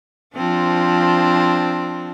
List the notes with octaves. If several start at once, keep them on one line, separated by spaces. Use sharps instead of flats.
F3 C4 D4